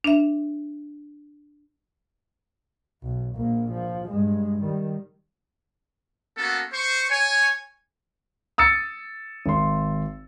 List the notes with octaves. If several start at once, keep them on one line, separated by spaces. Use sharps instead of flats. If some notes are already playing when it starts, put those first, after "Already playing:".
D4 E5
B1
A#1 A#3
F3
G2 G#3
D#3 G3
A#3 B3 C#4 F#4 A4
C5 C#6
C#5 G#5
D#6 E6 A6 C#7
G#1 C6